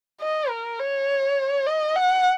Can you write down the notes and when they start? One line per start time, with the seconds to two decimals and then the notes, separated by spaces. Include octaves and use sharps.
0.21 D#5
0.49 A#4
0.79 C#5
1.66 D#5
1.96 F#5